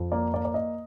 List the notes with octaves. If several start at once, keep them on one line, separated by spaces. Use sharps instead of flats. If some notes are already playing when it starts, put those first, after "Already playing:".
Already playing: F2
A#3 D5
A#3 D5
D5
A#3 D#5